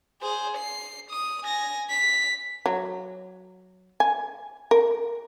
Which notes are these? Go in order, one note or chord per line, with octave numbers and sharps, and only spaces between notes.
G#4 C5
C7
D#6
G#5 A#6
B6
F#3
G#5
A#4